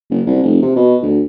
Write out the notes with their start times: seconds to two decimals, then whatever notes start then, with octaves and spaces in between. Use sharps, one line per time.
0.10 F#1
0.27 C2
0.43 F1
0.62 C3
0.76 B2
1.03 D2